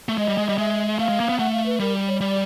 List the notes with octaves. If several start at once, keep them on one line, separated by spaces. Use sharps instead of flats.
A3
G#3 D#5
G3
G#3
G3 D#5
G#3 E5
E5
A3 F5
G#3
A#3
B3
A3 F#5
F5
B4
G3 A#4
C#5
G3 D5